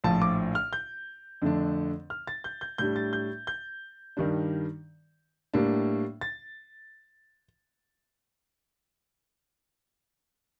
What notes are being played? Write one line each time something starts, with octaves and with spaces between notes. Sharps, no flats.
A#1 A2 F3 A5
D6
F6
G6
F2 D3 A3 D4
F6
A6
G6
G6
A2 G3 D4 G6
A6
G6
G6
G2 D#3 G3 D4
A2 G3 A#3 D4
A6